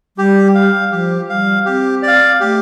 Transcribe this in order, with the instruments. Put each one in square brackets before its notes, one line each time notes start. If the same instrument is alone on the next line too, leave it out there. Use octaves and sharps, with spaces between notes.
[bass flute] G3 [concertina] G4
[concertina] F5
[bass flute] F3 [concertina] G4
[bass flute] G3 [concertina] F5
[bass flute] C4 [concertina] G4
[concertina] D5
F5
[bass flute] A3 [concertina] G4